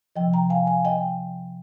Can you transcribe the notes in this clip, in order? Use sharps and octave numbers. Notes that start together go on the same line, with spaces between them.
C3 F3 D#5 G5
G5 A#5
F5 G#5
F5 G#5
D#5 G5